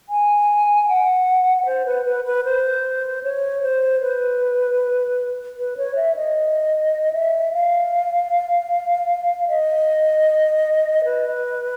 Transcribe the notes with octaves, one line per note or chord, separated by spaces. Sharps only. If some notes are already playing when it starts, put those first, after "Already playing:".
G#5
F#5
C5
B4
B4
B4
C5
C#5
C5
B4
B4
C#5
E5
D#5
E5
F5
D#5
B4